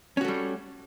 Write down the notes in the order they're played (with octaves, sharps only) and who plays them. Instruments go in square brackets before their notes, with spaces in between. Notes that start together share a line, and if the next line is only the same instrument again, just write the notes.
[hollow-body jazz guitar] C#4
F#4
A3
G3